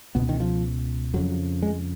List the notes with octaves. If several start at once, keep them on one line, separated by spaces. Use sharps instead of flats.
C#2 B2 B3
D#3
F3
F2 C#3 F#3
G#3